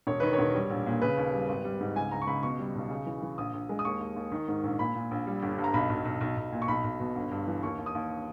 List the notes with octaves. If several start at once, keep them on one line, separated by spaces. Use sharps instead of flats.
E1 C#5
D#3 B4
C#5
E1
G3
A#1
A#2
C#3 B4
D#2
G3
G#1
G3
G#2
C#2 G#5
C#2 A#5
C#6
C#2 B5
B2 C#6
G3
B1
C#3
E3
E3
A#1 D#6
A#1
G#3
D#6
D#2 C#6
D#2
D#2
D#3
G#2
A#1
A#2 B5
A#2
A#1
G3
G1
G2
A#5
B1 B5
B1
B1
B1
B1
A#2
C#6
B1 B5
B1
B2
G1
G2
E3
D#2 C#6
D#2
D#6
D#2